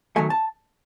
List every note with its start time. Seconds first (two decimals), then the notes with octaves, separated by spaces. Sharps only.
0.16 D#3 F#3 A3 G#5
0.30 A5